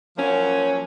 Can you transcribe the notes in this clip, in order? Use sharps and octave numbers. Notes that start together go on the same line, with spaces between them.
F3 F#3 A#3 C#4